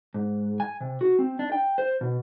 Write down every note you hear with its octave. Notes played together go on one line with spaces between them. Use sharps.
G#2
G#5
C3
F#4
C4
D4
G5
C5
B2